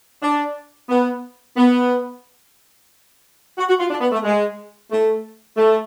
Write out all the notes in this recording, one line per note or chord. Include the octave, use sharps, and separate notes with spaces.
D4
B3
B3
F#4
F#4
F4
D4
B3
A3
G#3
A3
A3